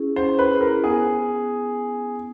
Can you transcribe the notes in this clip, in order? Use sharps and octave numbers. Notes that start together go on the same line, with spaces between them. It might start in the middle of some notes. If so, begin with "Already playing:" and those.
Already playing: C#4 E4 G#4
C#4 C5
B4
E4 G#4
A#4
B3 G#4